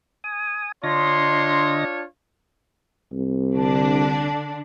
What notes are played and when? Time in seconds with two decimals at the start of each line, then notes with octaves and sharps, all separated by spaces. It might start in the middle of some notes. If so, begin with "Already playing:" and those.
0.24 G#5 D#6
0.84 D3 D4 F4 C#5 D#5 C6 A#6
3.12 C2
3.52 D3 D4